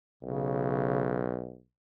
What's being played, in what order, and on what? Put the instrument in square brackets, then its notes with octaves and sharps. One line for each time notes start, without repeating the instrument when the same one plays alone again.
[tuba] B1 [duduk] C#3